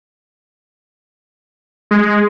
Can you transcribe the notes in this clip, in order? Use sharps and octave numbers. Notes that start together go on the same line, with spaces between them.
G#3